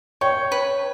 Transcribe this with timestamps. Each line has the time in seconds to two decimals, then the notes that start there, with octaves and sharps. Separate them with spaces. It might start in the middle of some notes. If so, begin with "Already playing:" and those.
0.21 C#5 G5 C#6
0.52 B4